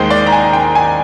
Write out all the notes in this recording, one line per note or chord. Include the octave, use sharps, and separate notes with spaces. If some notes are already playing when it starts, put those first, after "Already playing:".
Already playing: D#2 D#3 G#3 C5
D5
A#5
G#5
G5
G#5